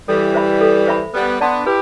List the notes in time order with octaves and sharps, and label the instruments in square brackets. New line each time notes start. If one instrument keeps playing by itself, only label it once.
[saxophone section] E3 G3 [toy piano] A4
[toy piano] C5 E5 B5
A4
C5 E5 B5
[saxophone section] G3 B3 [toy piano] B4
[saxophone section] B3 D4 [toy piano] D5 A5 C6
[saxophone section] E4 G4 [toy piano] B4